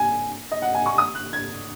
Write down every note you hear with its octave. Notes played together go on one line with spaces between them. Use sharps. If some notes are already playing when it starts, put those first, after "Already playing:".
Already playing: G#5
D#5
F#5
G#5
C#6
D#6
F#6
G#6